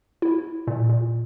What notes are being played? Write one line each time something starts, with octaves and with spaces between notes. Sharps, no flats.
E4
A#2
A#2